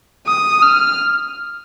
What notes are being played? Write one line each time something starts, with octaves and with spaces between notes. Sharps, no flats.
D#6
F6